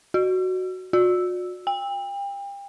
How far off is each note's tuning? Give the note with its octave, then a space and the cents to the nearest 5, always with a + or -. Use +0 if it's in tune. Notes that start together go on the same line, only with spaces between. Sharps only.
F#4 +5
F#4 -40
G5 +35